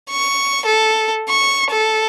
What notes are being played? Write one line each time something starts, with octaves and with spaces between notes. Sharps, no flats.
C#6
A4
C#6
A4